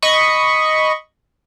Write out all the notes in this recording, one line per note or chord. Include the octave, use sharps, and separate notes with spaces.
D#5 B5 C#6